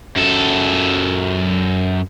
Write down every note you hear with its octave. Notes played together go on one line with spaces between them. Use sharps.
F#2 A4